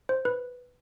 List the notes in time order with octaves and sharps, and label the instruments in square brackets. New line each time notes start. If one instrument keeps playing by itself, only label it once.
[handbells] C5
B4